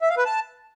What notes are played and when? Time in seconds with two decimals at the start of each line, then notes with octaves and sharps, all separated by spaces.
0.02 E5
0.09 F5
0.17 B4
0.25 A5